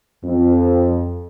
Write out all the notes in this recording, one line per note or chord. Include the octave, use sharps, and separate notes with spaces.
F2